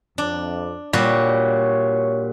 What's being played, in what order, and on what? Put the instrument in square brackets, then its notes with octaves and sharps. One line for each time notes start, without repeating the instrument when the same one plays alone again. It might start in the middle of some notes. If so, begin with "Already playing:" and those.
[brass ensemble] F2 [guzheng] D4
[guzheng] A#2 G3 F#4 [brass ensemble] C#5